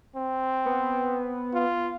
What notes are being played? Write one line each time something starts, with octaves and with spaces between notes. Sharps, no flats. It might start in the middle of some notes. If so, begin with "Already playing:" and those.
C4
B3
F4